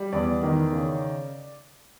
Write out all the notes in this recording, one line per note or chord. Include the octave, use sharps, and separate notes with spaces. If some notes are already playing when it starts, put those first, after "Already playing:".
Already playing: G3
E2 D5
D#3
C#3